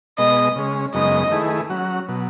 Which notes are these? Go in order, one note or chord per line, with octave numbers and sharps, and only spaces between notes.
B2 G#3 B3 D#5
C#3 G#3 C#4
F#2 C#3 G#3 B3 D#4 D#5
D#3 A3 E4 G#4 B4
F#3 C#4 F#4
B2 F#3